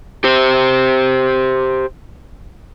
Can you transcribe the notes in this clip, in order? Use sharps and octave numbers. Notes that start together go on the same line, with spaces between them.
G4 C5